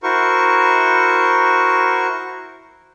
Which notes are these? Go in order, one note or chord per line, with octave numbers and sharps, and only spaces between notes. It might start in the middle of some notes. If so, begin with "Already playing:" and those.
E4 F#4 A#4 C5 C#6